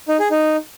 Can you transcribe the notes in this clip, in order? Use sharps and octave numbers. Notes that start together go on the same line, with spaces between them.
D#4
G#4
D#4